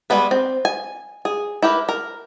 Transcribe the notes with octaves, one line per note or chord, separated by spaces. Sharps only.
G3 G#3 B3 B4
C4
G#5
G#4
E4 G4 A#4 B4
A#4